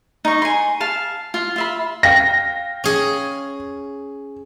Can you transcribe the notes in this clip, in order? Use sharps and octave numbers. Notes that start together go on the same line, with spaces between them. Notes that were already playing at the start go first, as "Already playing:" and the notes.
D#4 C#6
G#5 C6
F5 A5
F4
F4 E5 B5
F5 G5 A#6
C#4 G#4